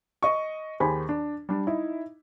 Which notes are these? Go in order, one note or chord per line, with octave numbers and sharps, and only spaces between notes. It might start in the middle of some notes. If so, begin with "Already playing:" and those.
D#5 C#6
D#2 G4 G#4 C5 G#5 B5
D4
G3 D4
D#4 E4